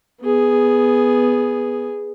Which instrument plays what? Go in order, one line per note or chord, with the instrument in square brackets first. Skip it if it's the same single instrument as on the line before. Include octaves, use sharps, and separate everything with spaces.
[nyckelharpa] B3 G#4